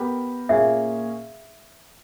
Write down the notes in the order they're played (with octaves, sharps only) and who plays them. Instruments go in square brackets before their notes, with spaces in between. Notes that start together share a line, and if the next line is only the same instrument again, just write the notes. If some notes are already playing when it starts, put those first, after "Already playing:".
Already playing: [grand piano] B3 G4 A#4
[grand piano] A#2 A#3 C#4 G#4 [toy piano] E5